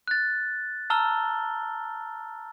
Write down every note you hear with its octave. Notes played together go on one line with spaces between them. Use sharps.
F#6 A6
A5 A#5 E6 F6 G7